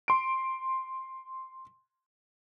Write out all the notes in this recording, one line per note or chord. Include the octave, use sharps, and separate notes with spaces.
C6 D7